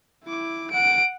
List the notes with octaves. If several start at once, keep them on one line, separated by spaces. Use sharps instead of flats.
E4 D6
F#5 D7